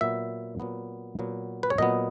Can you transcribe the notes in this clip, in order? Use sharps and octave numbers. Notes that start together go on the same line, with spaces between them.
A#2 F#3 B3 E5
A#2 F#3 B3
A#2 F#3 B3
B4
C#5
A#2 F#3 B3 D#5